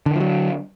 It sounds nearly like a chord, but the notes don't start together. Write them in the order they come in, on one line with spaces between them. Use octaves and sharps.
D3 D#3 F3 F#3